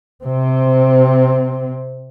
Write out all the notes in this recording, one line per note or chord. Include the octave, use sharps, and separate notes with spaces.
C3 C4